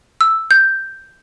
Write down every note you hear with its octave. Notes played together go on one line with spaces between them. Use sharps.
E6
G6